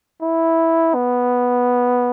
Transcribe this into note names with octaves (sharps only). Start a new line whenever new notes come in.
E4
B3